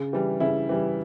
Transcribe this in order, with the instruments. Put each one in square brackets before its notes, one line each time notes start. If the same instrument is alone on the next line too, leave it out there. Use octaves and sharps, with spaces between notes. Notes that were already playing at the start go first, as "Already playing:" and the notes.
Already playing: [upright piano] C#3
E3 G3
C#3 E4
E3 G3